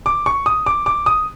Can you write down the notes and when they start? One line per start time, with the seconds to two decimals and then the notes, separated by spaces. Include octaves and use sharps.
0.06 D6
0.26 C#6
0.46 D#6
0.66 D6
0.86 D6
1.06 D#6